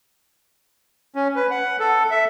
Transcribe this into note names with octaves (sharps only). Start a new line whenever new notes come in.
C#4
B4
F#5
A4
E5